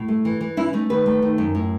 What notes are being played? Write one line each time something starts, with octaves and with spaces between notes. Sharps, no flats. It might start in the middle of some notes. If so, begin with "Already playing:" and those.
Already playing: A2
A3
E3
E3
C#4 E4
A3 D#4
D#3 B4
A3
D#3
F#2
A2